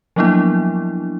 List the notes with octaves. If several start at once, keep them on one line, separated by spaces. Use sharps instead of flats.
F3 F#3 A#3 B3 D4 E4